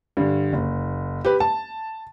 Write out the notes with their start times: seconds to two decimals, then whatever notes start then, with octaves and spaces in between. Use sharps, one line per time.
0.17 G2 D3
0.53 F#1
1.25 G4 B4
1.40 A5